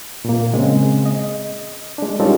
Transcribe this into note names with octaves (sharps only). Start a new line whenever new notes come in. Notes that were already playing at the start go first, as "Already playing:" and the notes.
A#2 A#3
C#3 G#3 C4
D#5
G#3 D4
G3 C#4 D#4 F4 A4 A#4